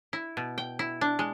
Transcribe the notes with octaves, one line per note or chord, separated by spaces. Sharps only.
E4
B2
G5
E4
D4
G#3